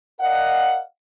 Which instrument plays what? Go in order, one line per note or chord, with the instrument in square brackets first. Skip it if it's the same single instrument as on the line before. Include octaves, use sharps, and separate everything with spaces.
[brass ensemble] A#4 D5 D#5 F5 F#5